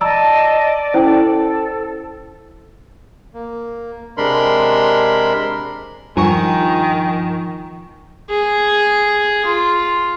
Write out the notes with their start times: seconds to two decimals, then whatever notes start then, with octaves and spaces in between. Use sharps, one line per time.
0.01 D5 D#5 A5 A#5 E6
0.94 C#4 E4 A4 C5 G5
3.34 A#3
4.17 C3 G#3 D4 A#4 B5 C6
6.17 G2 D#3 F3 G#5 A#5 C#6
8.30 G#4
9.46 F4